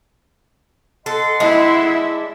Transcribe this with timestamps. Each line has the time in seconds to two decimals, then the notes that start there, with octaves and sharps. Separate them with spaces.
1.06 A4 D#5 F#5 C6
1.40 G#3 D4 E4 E5